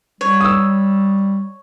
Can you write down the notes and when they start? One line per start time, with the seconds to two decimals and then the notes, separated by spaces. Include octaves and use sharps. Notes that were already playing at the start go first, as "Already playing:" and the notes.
0.21 G3 C#5
0.41 D#6 E6